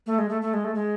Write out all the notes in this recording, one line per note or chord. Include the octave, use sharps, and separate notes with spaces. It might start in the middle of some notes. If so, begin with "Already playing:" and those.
A3
G#3
A3
A3
G#3
A3
G#3